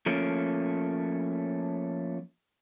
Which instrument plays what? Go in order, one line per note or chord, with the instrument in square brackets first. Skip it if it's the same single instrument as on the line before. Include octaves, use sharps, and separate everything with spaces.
[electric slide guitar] F3 A3 A#3 C#4